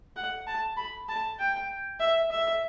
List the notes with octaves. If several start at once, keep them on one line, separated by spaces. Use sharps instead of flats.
F#5
A5
B5
A5
G5
E5
E5